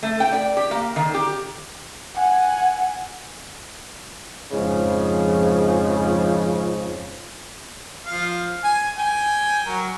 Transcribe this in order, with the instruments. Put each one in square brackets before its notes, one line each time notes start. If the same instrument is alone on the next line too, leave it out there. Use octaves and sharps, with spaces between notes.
[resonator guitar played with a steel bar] A3
G5
D5
G4
A#3
D#3
G4
[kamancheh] F#5 G#5
[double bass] F2 [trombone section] G#2 C#3 F3
[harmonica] F3 F5
G#5
G5 G#5
F#3 A#4